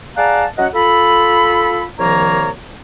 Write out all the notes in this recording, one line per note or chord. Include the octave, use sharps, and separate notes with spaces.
G#4 D5 F5 F#5 A5 A#5
F#3 C#4 D#5 F#5
F4 A4 B5
C2 D#3 F3 A#3 C#5 A#5